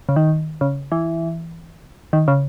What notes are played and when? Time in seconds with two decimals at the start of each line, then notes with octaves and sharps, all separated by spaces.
0.09 C#3
0.16 D#3
0.61 C#3
0.92 E3
2.13 D#3
2.28 C#3